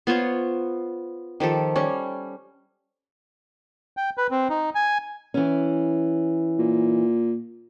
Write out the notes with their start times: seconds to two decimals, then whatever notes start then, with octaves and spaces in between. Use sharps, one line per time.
0.07 B3 F4 C5 C#5
1.40 D#3 F3 G4 A4
1.76 G3 C#4
3.97 G5
4.18 B4
4.31 C4
4.49 D#4
4.75 G#5
5.34 E3 C#4
6.59 A#2